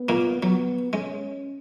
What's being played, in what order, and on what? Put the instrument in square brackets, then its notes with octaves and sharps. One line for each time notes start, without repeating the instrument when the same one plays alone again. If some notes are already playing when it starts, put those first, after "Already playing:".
Already playing: [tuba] B3
[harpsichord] A#2 A#3
[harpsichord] F#3 [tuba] B3
[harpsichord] G#3 [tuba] C#4